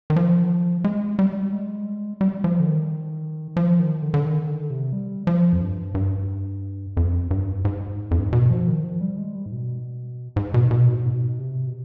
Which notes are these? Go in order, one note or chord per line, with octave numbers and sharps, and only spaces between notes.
D#3
F3
G#3
G3
G#3
G3
F3
D3
D#3
F3
D#3
D3
D3
D#3
D3
C3
G3
F3
F2
G2
G2
F2
G2
G#2
F2
G2
G#2
B2
F3
D#3
F3
G3
G#3
G3
G#2
B2
G#2
B2
B2
G#2
B2
C3
B2